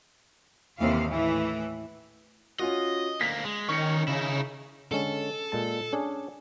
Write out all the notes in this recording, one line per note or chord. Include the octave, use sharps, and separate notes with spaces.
D#2 C3 E3 F5
A2 E3
C#4 F4 F#4 D#5
D2 A#3 B6
G#3
D#3 C#4 D#4 C#6 C#7
C#3 D#4 E4
D3 G#3 C#4 A4
A#2 G#3 A5
C#4 D4 G#4